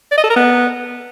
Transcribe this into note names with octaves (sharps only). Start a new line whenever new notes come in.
D5
D#5
A4
A#4
B3